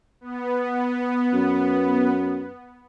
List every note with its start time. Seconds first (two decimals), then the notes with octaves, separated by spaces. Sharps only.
0.21 B3
1.34 F#2